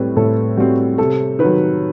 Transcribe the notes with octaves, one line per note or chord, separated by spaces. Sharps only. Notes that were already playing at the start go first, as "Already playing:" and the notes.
Already playing: A2 G3 C4 B4
A2 A4
G3 C4 F#4
C3 A4
D#3 F#3 B4